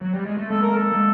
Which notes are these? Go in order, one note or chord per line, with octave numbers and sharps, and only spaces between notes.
F#3
G3
G#3
A3
G#3 A#3 A4
A#4
A4
G#3 A#3